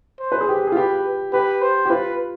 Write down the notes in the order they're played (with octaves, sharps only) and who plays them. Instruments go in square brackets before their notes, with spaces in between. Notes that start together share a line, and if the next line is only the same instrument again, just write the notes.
[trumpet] C5
[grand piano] B4
G#4
G4
G#4
F4
[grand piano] G4 [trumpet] B4
[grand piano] G4 [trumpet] B4
[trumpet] C5
[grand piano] G4
[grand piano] F4 [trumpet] B4